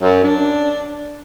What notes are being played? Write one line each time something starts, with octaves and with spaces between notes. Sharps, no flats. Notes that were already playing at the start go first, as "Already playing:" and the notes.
F#2
D4